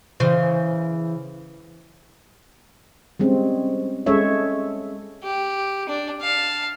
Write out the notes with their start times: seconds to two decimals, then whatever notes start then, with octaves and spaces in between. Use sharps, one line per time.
0.20 C#3 E3 C5
3.20 G3 G#3 C4 C#4
4.06 G#3 C#4 A4 C#5 E5
5.23 G4
5.89 D4
6.22 F5 A5